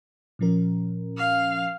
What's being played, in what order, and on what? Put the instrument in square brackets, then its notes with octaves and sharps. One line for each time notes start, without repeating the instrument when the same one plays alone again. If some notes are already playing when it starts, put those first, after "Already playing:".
[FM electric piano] A#2 F3 C#4 A#4
[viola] F5